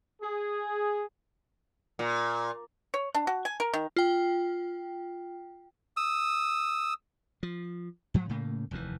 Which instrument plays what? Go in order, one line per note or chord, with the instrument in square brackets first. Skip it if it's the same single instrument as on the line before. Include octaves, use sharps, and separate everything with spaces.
[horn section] G#4
[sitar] A#2
[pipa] C#5
D4
F#4
G#5
A#4
D#3
[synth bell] F4 G5
[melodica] D#6 E6
[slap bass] F3
G#2 F3 F#3
A2 C#3 A3 A#3
F1 D#2 B2 E3